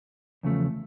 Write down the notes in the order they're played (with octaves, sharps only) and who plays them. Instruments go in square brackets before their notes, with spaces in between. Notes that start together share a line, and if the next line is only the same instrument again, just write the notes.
[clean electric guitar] E2 C#3 F3 A3